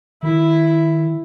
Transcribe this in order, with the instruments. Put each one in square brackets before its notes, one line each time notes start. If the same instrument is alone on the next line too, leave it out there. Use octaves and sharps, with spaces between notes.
[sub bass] D#3 [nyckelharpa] E4